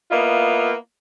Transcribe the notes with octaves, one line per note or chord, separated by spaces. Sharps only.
A#3 B3 E4 F4 D#5